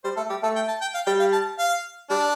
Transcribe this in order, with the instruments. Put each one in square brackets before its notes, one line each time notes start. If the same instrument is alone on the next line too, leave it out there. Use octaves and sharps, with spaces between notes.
[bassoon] G3 [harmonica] C5
[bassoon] A3 [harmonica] A4
[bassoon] G3 [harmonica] G4
[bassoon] A3 [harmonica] A4
[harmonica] G5
A5
G5
F5
[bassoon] G3 [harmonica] G5
[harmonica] F5
A5
F5
[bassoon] G3 [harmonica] D4